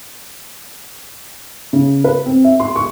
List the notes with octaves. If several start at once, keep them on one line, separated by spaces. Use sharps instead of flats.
C#3
B4
C4
E5
C6
C#6